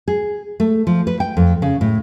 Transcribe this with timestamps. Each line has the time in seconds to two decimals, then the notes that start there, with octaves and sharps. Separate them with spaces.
0.08 G#4
0.60 A3
0.87 F3
1.07 B4
1.20 G5
1.37 F2
1.62 C#3
1.81 A2